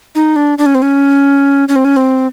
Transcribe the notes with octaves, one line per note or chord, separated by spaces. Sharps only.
D#4
D4
D4
C#4
C4
C#4
C#4
C4
C#4
C4